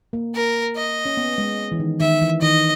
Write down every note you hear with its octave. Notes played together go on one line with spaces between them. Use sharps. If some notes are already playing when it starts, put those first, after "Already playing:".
A#3
A#4
D#5
C#4
B3
G#3
E3
D#3
D#3 E5
E3
D#3 D#5